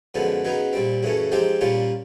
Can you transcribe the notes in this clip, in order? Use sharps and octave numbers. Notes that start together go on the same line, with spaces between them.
F#2 D3 F3 G#3 B3
C#3 F#3 B3 D#4
A#2 G3 C4
F#2 C#3 E3 A3 C#4
F3 G#3 C4 D#4 G4
A#2 G3 A#3 C#4 F4